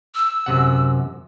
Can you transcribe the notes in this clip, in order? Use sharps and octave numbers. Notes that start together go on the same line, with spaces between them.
E6
F#2 C3 F#5